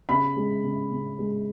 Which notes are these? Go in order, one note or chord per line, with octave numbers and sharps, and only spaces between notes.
C#3 B5
G#3
C#3
C#3
G#3